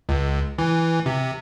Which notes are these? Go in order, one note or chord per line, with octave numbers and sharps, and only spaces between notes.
C#2
E3
C3